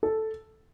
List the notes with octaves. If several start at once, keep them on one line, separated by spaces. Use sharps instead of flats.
A4